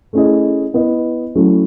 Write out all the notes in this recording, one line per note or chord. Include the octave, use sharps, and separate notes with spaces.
A3 C#4 E4 G#4 D#5
B3 E4 B4 D#5
F#3 A3 C#4 E4